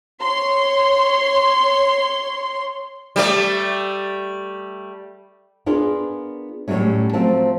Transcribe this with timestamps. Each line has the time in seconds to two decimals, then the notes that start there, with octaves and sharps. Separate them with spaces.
0.21 C#5 C6
3.16 G3 A3 D5
5.66 B3 D4 F4 G#4 A#4
6.68 A2 F#3 G3 A#3 C#4
7.13 F3 F#3 A3 C4 A5